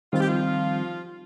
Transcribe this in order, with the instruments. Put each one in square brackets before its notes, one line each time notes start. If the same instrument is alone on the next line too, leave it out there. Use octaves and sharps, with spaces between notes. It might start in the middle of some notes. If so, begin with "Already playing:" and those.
[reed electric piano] D#3 G3 C4 [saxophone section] F4
[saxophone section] G4
F3 F4